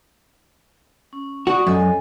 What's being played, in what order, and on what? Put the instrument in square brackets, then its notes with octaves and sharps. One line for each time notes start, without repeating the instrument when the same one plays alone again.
[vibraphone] C#4
[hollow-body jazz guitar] F#4 [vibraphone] D5 C#6 D#6
[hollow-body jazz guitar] F#2 [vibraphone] A4 D#5 G#5